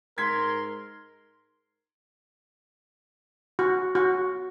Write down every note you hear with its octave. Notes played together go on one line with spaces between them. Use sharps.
G#2 A#4 C6 G#6 B6
F#4
F#4